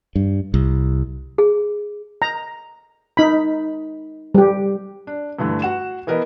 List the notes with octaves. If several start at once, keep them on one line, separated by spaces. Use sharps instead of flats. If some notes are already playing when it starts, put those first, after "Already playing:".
G2
C2
G#4
A#5
D#4 B5
G3 G4
D4
G2 D3 E3 A3
F#4 F#5 E7
E3 B3 A#4 B4 D#5